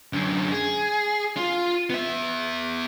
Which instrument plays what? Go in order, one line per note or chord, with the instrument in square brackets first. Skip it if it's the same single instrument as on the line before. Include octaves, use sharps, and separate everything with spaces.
[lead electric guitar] F#2 D3
G#4
F4
B3 E5